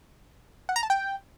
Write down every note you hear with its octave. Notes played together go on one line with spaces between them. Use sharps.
F#5
A#5
A5
G5